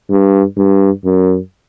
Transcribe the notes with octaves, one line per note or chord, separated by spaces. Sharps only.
G2
G2
F#2